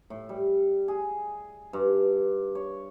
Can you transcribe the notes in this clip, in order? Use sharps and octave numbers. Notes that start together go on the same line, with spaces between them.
A2
G3
G#4
G2
C#5